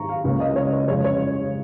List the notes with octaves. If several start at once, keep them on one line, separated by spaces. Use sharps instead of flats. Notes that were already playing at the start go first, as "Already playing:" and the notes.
Already playing: G#2 D#3 A#5 C#6
F5
C#2 C#3 A#3 C#4 F5
D#5
C#5
C#5
F2 C#3 G#3 C#5
C#5